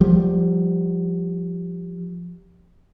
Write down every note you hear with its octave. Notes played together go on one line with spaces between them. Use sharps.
F3 G3